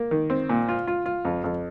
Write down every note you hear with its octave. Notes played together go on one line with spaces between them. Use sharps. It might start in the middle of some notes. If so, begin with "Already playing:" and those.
Already playing: A#3
D#3
C4
A#2
F4
F4
F4
F2
F2